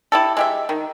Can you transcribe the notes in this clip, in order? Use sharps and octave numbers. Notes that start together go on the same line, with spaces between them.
E4 G4 A4
G#3 G4 E5
D#3